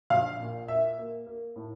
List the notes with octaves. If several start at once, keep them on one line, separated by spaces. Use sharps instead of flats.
A#1 F5
A#2
A#3 E5
A#3
A#3
A2